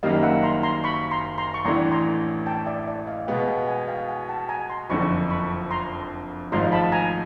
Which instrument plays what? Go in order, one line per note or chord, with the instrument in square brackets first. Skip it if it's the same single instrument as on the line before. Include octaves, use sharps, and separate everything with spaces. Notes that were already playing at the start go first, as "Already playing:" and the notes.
[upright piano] F#1 F#2 D#3 G3 A#3 [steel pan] D#5 F5
[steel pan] E5 F#5
A#5 C6
A#5 C6
B5 C#6
A#5 C6
A#5 C6
C#6
[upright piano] A1 A2 E3 A3 D4 [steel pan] A#5 C6
[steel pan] A#5 C6
G5 A5
D5 E5
D5 E5
D#5 F5
[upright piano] B2 G#3 B3 [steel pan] F5 G5
[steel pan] F5 G5
F#5 G#5
F5 G5
F#5 G#5
G5 A5
G#5 A#5
A#5 C6
[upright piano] F#1 F2 D3 [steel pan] B5 C#6
[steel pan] B5 C#6
A#5 C6
[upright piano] G#1 G#2 F3 A3 [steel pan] A#5 C6
[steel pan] A5 B5
G#5 A#5